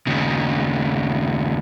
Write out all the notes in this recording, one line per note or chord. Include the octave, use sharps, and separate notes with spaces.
D#2 C#3